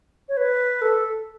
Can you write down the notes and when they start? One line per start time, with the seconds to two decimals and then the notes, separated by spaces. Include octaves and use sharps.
0.29 C#5
0.37 B4
0.82 A4